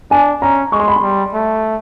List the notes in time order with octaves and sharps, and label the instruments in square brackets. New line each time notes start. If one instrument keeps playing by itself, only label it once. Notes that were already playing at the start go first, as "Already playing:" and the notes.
[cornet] D4 [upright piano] G#5
[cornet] C#4 [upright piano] A#5
[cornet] G#3 [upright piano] C#6
[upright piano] C6
B5
C6
[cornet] G3
A3